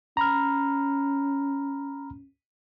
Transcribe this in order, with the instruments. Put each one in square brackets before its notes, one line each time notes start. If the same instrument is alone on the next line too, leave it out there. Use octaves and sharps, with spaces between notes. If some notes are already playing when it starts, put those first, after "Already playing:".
[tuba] C#4 [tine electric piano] A#5 B5 F6